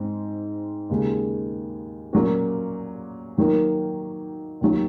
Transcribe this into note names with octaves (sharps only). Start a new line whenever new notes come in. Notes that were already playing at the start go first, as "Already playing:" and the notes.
Already playing: G#2 C4
D#2 C#3 G#3
A#2 F#3 A#3 C#4 F#4
D#3 F#3 A#3
D#2 D#3 F#3